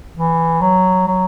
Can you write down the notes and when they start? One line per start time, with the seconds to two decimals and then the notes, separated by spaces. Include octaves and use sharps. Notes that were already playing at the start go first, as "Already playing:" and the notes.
0.16 E3
0.61 F#3
1.07 F#3